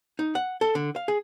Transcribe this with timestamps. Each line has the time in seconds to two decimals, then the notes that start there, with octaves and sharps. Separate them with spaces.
0.19 D#4
0.35 F#5
0.61 A4
0.75 D3
0.96 F5
1.08 G#4